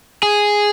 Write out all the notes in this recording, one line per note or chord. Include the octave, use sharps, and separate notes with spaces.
G#4